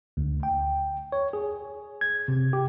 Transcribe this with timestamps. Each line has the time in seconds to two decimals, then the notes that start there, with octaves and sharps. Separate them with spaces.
0.17 D2
0.43 G5
1.12 C#5
1.33 G#4
2.01 G#6
2.28 C3
2.53 G4